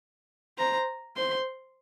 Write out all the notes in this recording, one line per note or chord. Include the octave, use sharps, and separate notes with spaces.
C5 A#5
C5 C6